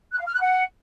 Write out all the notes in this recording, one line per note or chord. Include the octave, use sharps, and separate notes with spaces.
F#6
F5
F6
F#6
F#5